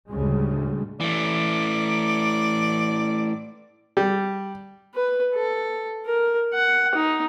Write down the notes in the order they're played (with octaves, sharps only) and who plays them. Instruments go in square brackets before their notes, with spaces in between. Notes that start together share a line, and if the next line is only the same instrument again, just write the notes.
[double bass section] D2 A2 C#3 G3 G#3
[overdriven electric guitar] E3 A3 [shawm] D5
[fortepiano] G3
[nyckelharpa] B4
A4
A#4
F#5
D#4